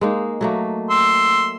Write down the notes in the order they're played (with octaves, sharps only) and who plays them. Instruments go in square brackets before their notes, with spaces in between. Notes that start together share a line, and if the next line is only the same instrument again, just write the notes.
[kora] G#3 A#3 D#4
F#3 A3 A#3
[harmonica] C6 E6